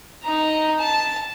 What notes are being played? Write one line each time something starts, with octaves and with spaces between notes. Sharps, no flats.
D#4 A#5
A5